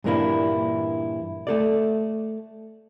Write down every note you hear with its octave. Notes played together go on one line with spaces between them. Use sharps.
G2 A#2 E3 A#3 D4 E4
A3 A4 D5